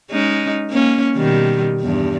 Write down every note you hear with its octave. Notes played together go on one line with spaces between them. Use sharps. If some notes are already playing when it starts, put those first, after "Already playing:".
G#3 C#4 D#4
A#3 C#4
B2 D#3 G3
E2 G2